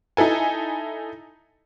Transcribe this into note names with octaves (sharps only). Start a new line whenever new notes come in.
D#4 E4 A4 G#5